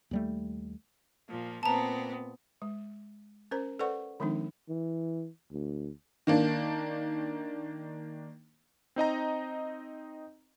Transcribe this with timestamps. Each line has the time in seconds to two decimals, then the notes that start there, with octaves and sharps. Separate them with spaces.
0.11 D#2 G3 A3
1.28 A#2 F3
1.63 A#2 B3 C4 A5 A#5
2.62 G#3
3.51 C#4 A#4 C5 A#5
3.79 A4 B4 C5 D5 F#5 C#6
4.20 D#3 F3 G#3 C4 D4 D#4
4.69 E3
5.52 D2
6.27 D#3 A#3 D4
8.96 C4 D#4 D#5 A#5